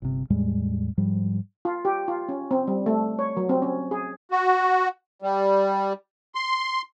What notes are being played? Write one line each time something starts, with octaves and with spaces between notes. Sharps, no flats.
G1 C3
E2 A2 G3 G#3
G#2 F3 G3
F4
G4
F4
C#4
C4
G3
A3
C#5
F#3
C4
C#4
G#4
F#4
G3
C6